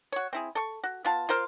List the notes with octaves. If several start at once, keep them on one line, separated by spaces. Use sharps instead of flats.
F#4 C#5
C4 E4 G#4
A4 C#6
F#4
B3 F4 A5
F4 A#4 C5 F5